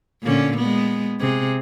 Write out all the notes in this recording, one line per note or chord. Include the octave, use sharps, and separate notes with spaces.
A#2 D3 C#4
G#3 B3
C3 G#4